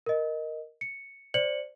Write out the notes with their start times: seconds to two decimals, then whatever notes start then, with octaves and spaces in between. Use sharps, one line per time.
0.06 A#4 D#5
0.81 C#7
1.34 C5 D5 C#7 F#7